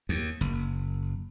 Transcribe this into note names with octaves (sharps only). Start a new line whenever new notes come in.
D#2
F#1